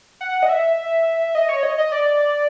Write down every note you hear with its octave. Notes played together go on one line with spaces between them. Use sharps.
F#5
D#5
E5
D#5
C#5
D#5
D#5
D5